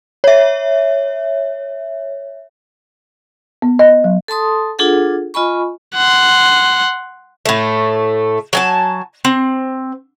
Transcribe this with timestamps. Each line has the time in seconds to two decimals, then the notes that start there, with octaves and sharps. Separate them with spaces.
0.24 C#5 E5
3.62 B3
3.79 D#5
4.04 F#3
4.28 A4 A5 C6 D#6
4.79 D4 F4 G#4 A4 F#5
5.34 F4 D#5 G#5 B5 C#6
5.95 F#5 C6
7.46 A2 A3
8.53 F#3 G#5 A5
9.25 C4